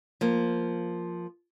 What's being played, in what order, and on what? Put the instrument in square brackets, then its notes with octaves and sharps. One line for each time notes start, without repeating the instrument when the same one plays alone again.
[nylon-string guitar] F3 A#3